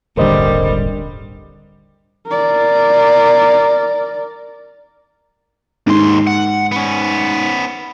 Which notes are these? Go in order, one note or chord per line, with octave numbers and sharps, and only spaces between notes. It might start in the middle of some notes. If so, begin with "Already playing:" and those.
D#1 G#1 D3 G3 A#4 C5 D#5
A#4 D5
D#2 G#2 C6
F#5
B3 C#4